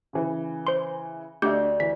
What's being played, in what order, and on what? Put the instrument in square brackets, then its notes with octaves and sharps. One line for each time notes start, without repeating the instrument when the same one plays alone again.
[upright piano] C#3 E3
[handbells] C5 C6
[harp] D2 [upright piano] D4 D#5 E5 [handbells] G4 G6
[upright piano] E3 [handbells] B6